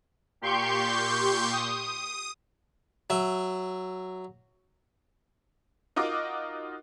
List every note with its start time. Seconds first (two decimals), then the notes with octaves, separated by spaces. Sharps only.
0.41 A#2 G4 C6 C#6 G6
1.52 D#6
3.10 F#3 E5
5.96 D#4 F4 F#4 A#4 D#5 D6